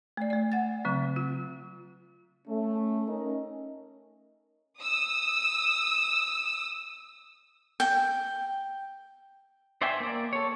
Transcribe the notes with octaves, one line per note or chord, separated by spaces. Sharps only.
A3 D5
A3 D5
F#5 A6
C#3 F#3 C4
F4
A3 C#4
C#4 D#4 A#4 D#5
D#6 E6
G5
C5 D5 E5 G5 G#5
A#3 D5
A4 C#5